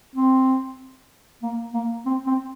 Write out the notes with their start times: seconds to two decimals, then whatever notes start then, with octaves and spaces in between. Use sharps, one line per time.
0.16 C4
1.42 A#3
1.74 A#3
2.06 C4
2.27 C4